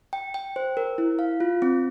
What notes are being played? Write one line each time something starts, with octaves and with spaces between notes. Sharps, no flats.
G5
G5
C5
A#4
E4
F5
F4
C4